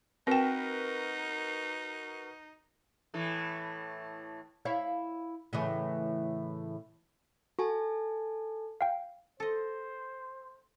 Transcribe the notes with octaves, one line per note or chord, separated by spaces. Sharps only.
C4 D#4 F#4 A#4 B4 G5
A2 E3 A3
E4 C#5 F5
A2 C#3 E3
F#4 A4 G#5 A5
F5 G5
A4 C5 D#5